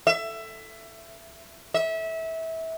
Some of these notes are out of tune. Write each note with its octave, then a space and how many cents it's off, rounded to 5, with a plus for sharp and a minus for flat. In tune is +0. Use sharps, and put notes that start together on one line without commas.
E5 +20
E5 -25